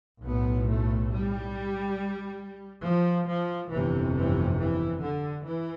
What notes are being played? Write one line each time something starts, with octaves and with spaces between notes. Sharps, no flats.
B1 A2 B3
A3
G3
F3
F3
G1 F2 C3 E3
E3
E3
D3
E3